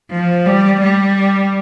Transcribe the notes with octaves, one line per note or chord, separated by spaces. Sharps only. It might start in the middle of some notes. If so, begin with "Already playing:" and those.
F3
G3
G3